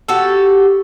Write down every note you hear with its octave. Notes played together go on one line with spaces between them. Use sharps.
F#4 G4 A4